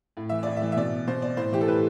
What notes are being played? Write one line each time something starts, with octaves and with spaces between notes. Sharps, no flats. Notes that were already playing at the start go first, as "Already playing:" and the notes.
A2
E3 E5
A2 D5
E5
E3
E5
B2 D5
B2 C5
D5
A2 C5
E3 G4
A4
A2 B4